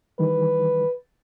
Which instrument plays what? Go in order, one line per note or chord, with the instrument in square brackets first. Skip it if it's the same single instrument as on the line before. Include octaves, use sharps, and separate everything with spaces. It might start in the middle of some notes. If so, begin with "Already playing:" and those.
[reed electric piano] D#3 E3 G3 [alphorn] B4